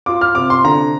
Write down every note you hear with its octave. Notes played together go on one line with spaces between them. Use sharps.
F4 D6
F6
C3 D6
C6
D3 A#5